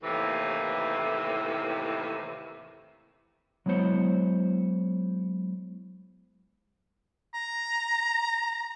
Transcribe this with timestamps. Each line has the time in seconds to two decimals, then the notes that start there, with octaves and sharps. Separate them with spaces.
0.03 D#2 A2 C3 E3
3.66 F#3 G#3 B3 E4 C5 C#5
7.34 A#5